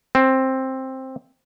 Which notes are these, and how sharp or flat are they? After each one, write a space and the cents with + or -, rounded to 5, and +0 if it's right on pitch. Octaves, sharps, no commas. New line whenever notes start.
C4 +10